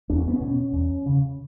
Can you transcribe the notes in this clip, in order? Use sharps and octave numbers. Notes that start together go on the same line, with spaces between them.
E2 D4
C#4
B3
C#4
B2
E2
C#3